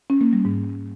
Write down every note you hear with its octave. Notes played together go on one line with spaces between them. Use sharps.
C#4
A#3
G3
G#2